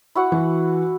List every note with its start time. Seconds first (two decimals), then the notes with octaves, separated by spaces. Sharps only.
0.15 E4 F#4 F#5
0.32 E3